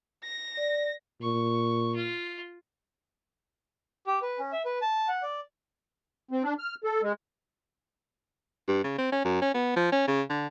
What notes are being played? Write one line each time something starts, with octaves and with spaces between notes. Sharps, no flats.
A#6
D5
A#2 C#6
F4
G4
B4
C#4
E5
B4
A5
F#5
D5
C4
D4
F6
A4
G#3
G2
C#3
C4
C#4
F#2
C#4
B3
F3
C#4
C#3
D3